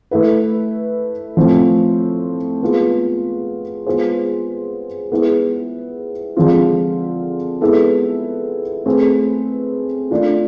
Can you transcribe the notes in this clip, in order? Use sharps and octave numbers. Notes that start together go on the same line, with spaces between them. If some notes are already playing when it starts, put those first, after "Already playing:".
A3 E4 B4
A2 F3 A3 C4
G#3 B3 F4 G#4
G#3 B3 F4 G#4 C5
G#3 B3 E4 G#4
D3 F3 G#3 C4 F4
G#3 B3 E4 A4
A3 C4 G#4 B4
A3 D4 F4